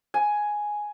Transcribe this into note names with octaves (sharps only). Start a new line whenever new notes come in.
G#5